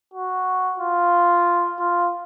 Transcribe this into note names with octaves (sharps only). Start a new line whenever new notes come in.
F#4
F4
F4